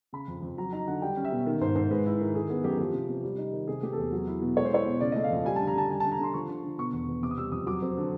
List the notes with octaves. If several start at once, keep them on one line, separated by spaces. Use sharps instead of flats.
C#3 B5
F2
F2
F#3 A#5
D#4 A#5
D3 F#5
G3 G5
C#4
E5
B2
D#3
G#2 C5
G#2 C5
G#3 B4
E4
D#3
D#3 G#4
B3 G#4
F#2 G4
G#4
F3 G4
C3
C3
G3
D#4
D#3
C3 G#4
A3 G4
A4
E2 G#4
F#3
E4
B2
G#3 C#5
C5
E4 C#5
B2
C#3 D5
A3 D#5
F5
F2
G3 G#5
D3 A5
A#5
D3 A5
G3 G#5
D3 A5
A#5
D3 C6
F3 C#6
D3
D3
B2 C#6
E2
E2
C3 D6
D#6
G3 E6
F2 D#6
F#3 D6
C4
D3